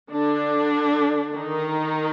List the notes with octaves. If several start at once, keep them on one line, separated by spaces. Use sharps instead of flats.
D3 D4
D#3 D#4